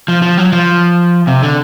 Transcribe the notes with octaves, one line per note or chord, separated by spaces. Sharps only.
F3
F3
F#3
F3
C3
D3